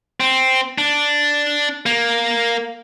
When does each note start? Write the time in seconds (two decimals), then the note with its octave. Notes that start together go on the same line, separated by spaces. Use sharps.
0.20 C4
0.78 D4
1.86 A#3